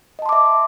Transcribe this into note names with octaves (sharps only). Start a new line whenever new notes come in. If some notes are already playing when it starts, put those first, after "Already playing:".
D#5 E5 A5 C6 D6